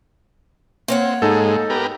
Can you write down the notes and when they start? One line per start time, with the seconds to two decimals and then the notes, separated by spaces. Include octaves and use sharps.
0.88 A#3 C4 C#5 F#5
1.22 G#2 G#3 D#4 A4
1.70 B3 G4 A#4